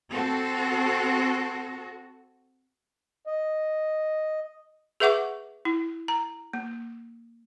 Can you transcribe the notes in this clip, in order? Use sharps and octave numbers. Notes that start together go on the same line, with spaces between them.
C4 F#4 A4
D#5
G#4 B4 E5 F#5 C#6 D6
E4
A#5
A#3